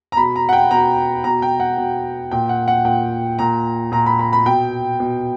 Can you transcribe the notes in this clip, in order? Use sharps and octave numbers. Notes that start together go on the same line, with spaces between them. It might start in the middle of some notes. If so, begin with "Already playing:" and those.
A#5
B2 B5
A#5
F#5
G5
B2 A#5
B2 A#5
G5
F#5
B2
A#2 G5
F#5
F#5
A#2 G5
A#2 A#5
A#2 A#5
B5
B5
B5
B2 G5
B2